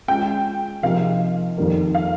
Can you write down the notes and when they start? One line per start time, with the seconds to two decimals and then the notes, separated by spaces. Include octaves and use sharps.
0.08 G#3 C#4 F4 G5
0.83 C3 F3 A#3 D#4 G#4 F5
1.58 F2 D#3 G3 A#3
1.95 F5